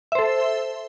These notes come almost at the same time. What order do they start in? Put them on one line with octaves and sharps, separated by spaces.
E5 C5 A4